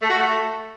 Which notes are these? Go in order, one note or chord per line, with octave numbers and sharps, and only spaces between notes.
A3
F#4
A3